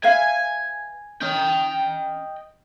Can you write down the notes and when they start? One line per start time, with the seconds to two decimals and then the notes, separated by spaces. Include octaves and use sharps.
0.04 B4 E5 F5 G#5
1.21 C#4 D#5 G5